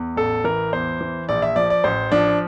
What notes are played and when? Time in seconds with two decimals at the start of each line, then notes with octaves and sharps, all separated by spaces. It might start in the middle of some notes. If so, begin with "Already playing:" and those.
Already playing: E2
0.16 A1 A4
0.44 E3 A#4
0.73 E2 C5
1.01 E3
1.29 A#1 D5
1.42 E5
1.56 F3 D5
1.70 D5
1.84 A1 C5
2.12 F3 D4